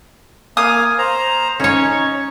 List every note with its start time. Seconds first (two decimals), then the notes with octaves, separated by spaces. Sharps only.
0.57 A#3 F5 G#5 D#6
0.98 C5 A#5
1.60 C#4 D#4 C#5